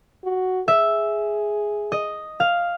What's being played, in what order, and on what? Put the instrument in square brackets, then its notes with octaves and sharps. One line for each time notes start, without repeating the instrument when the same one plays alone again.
[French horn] F#4
[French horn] G#4 [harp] E5
[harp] D#5
F5